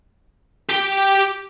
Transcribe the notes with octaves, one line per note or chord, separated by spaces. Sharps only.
G4 G5